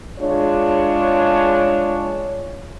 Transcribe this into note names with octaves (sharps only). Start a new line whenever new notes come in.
G#3 D4 F4 C#5